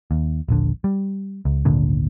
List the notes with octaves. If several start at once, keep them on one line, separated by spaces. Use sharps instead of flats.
D#2
D#1 A#1 D3
G3
C#2
G#1 D2 A#2 D3